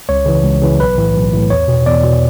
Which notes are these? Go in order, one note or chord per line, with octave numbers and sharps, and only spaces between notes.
C#2 C#5
C#3 E3
C#2
C#3 E3
B1 B4
A2 E3
B1
A2 E3
E2 C#5
B2
E2 D5
B2